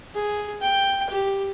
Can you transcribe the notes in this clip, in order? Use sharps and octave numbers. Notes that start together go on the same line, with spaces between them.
G#4
G5
G4